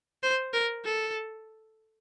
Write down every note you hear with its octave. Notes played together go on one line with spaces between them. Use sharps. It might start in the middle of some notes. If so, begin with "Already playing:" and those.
C5
A#4
A4